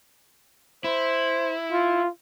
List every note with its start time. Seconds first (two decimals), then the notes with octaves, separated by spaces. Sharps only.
0.84 E4 C5
1.72 F4